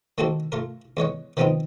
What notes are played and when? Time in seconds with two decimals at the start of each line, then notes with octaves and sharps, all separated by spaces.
0.18 D#3 G#3 A#3 F#4 A4 C5
0.52 A3 F4 A#4
0.97 E2 G#3 C#5 F#5
1.37 D#3 F3 G#3 B3 C4 D#4